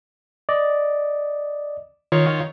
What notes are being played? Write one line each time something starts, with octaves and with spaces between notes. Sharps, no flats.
D5 D#5
D#3 F4 C#5